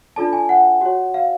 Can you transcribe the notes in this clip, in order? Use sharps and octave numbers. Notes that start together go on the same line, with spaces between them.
D4 F4 A4 D5 A5
G#5
F#5
F#4 C#5
F5